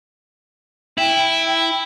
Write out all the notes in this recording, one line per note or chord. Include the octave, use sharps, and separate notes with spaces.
E4 G5